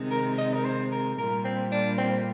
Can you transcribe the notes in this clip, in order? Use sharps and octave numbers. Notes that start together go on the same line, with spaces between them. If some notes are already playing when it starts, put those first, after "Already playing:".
Already playing: C3 D#3 G#3 D#4
A#4
D#5
A#4
C5
A#4
A#2 G3 A#3 A#4
C4
D4
C4